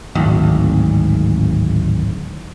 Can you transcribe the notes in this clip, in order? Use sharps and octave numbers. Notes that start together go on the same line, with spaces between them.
D1 G#1